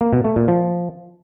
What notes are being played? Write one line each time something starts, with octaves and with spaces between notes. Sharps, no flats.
A#3
B2
A3
A#2
F3